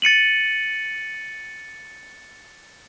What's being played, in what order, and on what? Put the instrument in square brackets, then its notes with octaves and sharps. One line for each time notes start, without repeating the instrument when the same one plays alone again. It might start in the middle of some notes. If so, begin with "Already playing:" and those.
[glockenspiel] A6 C#7 D#7 F#7